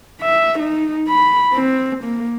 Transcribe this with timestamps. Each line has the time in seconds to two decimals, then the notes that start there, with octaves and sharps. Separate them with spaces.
0.22 E5
0.59 D#4
1.09 B5
1.53 C4
2.04 A#3